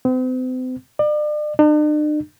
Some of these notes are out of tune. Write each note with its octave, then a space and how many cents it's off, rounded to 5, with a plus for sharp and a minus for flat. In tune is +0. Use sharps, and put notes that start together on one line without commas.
C4 -40
D5 +35
D4 +45